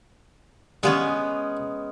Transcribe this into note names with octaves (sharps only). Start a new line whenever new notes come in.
D3 G3 G#3 A#3 B3 C#4